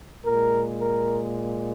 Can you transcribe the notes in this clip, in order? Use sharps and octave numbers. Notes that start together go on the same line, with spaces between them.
A#2 G#3 A#4
A#4